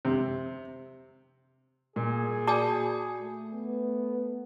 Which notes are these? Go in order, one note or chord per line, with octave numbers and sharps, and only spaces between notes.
C3
A#2 G#4
F#4 D5 G#5 A5 D6
A3
B3